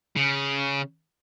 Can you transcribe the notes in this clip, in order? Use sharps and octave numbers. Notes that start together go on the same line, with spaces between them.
C#3